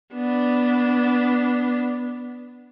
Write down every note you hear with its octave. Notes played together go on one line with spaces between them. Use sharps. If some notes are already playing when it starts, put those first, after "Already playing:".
B3 D4